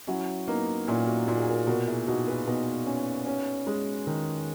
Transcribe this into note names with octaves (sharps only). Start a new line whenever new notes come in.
F#3 C#4 E4
A#3 B3 D#4
A#2 C#4 E4
D#4 F#4
A#2 D#4 F#4
G#4
F#4 A#4
B2 F#4 A#4
E4 G#4
B2 D#4 F#4
G#4 B4
B2 B3 D#4
C#4
C#4
G#3
D#3